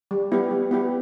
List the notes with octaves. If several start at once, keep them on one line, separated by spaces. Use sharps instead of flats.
G3
B3 E4 G4
G3
B3 E4 G4